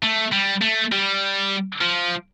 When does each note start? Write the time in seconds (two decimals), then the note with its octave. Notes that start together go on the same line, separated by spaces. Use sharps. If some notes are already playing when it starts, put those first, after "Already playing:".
0.03 A3
0.32 G3
0.61 A3
0.92 G3
1.81 F3